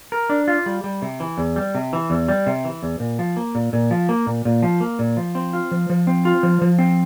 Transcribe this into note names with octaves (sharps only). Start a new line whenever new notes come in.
A#4
D4
F4
G3
G3
C3
E3
E2
G3
C3
E3
E2
G3
C3
E3
E2
A#2
F3
A#3
A#2
A#2
F3
A#3
A#2
A#2
F3
A#3
A#2
F3
C4
F4
F3
F3
C4
F4
F3
F3
C4